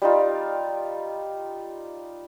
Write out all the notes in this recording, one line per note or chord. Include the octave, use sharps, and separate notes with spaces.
G3 D#4 F4